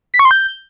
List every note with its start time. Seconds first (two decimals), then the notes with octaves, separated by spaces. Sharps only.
0.14 B6
0.19 C#6
0.25 C6
0.31 G6